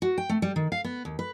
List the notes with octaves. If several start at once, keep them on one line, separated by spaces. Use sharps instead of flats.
F#4
G5
A3
G3
D#3
F5
B3
D#2
B4